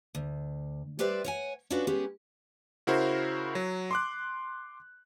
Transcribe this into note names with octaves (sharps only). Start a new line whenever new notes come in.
D2
G3 G4 B4 C5 D5 E5
C#5 F#5 G#5
C#4 D4 F4 F#4 B4
G#3 B3 C#4 G4 G#4
C#3 E4 F#4 A#4 C5
F#3
C6 D6 F#6